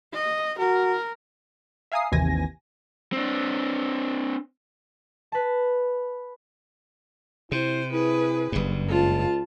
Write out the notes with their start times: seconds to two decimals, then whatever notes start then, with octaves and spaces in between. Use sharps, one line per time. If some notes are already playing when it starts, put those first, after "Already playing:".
0.13 D#5
0.59 F#4 A#4
1.92 E5 F5 G#5 A#5 D#6 C7
2.12 G#1 D#2 C3 E3 G#5 A#6
3.13 C4 D4
5.32 B4 A5
7.52 C3 E4 C5
7.93 E4 G#4 B4
8.52 F#1 G2
8.88 C#2 F4 A5